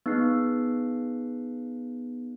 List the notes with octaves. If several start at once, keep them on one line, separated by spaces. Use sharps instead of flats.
B3 D#4 G#4 F#6 C7